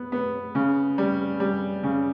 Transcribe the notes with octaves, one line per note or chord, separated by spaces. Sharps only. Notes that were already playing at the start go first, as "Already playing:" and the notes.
Already playing: B3
B3
C#3
G3
G3
C#3